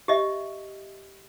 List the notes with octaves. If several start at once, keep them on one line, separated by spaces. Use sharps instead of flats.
G4 D#5 E5